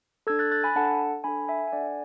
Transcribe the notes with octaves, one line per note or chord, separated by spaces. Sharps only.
D4 A4 E6 G#6
F#6 A6
F#6 A6
G#5 B5
D4 A4 F#5 A5
D4 A4 G#5 B5
E5 G#5
G#5
D4 A4 D5 F#5